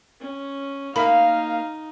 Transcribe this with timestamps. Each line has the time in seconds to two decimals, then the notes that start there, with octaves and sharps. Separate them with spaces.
0.21 C#4
0.96 A#3 D#4 F#4 A#4 E5 F5 B5